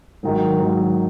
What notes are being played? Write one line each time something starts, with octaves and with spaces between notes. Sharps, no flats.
G#2 D#3 F#3
G#2 D#3 F#3